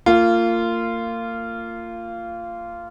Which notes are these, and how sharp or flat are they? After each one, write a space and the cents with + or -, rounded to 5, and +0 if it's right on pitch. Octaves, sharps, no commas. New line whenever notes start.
A#3 -30 F4 -15